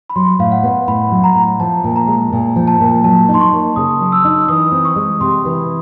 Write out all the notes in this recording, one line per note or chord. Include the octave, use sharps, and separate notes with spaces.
B5
F#3 C6
A2 F5
F#5
B3
A2 B5
F#3
A#5
A2
F3 A5
A#2
A#5
G#3
A#2
F3
A5
A#2
F#3 A5
D#4
C6
C#6
A#3
C#3 D#6
F#3
E6
D#4
E3 D#6
C4
C#6
G#3
C3 C6
E3